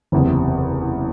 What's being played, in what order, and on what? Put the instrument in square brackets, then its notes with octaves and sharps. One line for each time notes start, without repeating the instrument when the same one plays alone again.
[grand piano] F#1 E2 C3